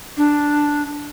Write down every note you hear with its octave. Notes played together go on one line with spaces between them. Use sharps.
D4